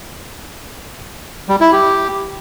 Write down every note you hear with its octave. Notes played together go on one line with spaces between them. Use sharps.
G3
E4
G4